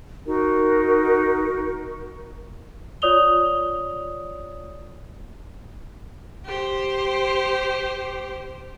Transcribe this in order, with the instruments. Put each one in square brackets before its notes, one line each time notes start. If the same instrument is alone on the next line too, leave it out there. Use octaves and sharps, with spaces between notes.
[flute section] D#4 F#4 A#4
[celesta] F4 C#5 D5 D#6 F7 G7
[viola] G4 C5